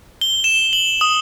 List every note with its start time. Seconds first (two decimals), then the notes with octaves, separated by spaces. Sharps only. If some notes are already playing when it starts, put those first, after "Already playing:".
0.21 G7
0.44 E7
0.73 F#7
1.01 D#6